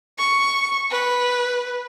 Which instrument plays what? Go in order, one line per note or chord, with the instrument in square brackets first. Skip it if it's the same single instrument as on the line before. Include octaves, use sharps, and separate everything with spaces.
[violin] C#6
B4